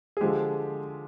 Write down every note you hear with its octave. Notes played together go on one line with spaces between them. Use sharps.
G#4
D3 F3 G#3 G4